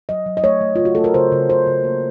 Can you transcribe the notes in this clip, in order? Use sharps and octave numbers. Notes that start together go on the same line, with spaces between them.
F#3 D#5
F#3
D#5
A3 C#5
A3
C#3 F4
F#4
A3 A4
A#4
C#3 C5
C#3
C#3 C5
C#3
A#3